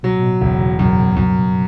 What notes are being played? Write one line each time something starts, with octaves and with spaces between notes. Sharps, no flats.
B2 F#3
A2
B2
E1 C#3
F#2 B2
G2
F#2
G2